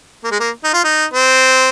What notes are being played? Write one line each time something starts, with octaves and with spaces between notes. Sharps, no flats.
A#3
G#3
A#3
D#4
F4
D#4
C4